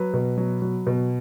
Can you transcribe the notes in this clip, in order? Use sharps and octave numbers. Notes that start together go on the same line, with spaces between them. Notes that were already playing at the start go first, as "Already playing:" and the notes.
Already playing: F#3 B4
B2
F#3
F#3
B2